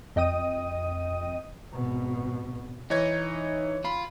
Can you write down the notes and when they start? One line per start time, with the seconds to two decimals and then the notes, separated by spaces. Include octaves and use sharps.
0.16 F2 D#5 G5 D#6 D#7
1.74 G#1 B2
2.90 E3 D#4 C#5 G#6
3.85 F4 B5